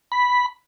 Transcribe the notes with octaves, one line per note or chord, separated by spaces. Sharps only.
B5